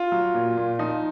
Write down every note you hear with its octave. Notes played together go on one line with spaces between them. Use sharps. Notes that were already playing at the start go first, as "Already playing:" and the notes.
Already playing: F4
F#3
A#2
A#2
F3 D#4